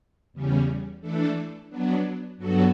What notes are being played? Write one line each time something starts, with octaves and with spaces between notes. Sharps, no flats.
E2 C#3 G3 C#4
E3 A3 D4 A4
F#3 B3 D4
G2 F#3 B3 F#4 A4